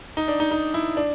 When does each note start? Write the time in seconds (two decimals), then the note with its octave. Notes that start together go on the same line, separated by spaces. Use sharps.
0.17 D#4
0.28 D4
0.40 D#4
0.51 D#4
0.74 E4
0.97 D4